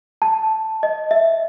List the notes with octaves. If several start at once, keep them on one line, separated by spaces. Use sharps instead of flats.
A5
D#5
E5